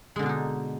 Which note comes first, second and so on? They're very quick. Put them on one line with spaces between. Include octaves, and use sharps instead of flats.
G#3 D3 B2 D4 D#4